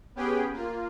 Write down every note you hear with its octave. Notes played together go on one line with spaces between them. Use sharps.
B3 C#4 G4 G#4 B4 G5
A#3 F4